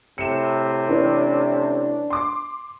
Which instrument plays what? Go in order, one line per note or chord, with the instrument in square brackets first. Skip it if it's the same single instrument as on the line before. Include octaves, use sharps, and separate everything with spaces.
[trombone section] A2 C3 [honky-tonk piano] C#7 E7
[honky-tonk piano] E3 C#4 [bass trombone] D4
[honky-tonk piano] C6 D6